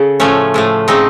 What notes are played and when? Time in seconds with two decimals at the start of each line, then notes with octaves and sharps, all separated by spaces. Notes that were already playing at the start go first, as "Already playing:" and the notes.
Already playing: C#3 A4
0.20 A2 F3 A3 C#4
0.54 A2 F3 A3
0.88 C#3 A3 C4 D#4